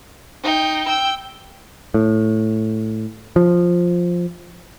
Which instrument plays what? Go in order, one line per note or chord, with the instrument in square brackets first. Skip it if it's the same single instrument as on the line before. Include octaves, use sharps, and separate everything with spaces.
[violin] D#4 G5
G5 E6
[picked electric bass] A2
F3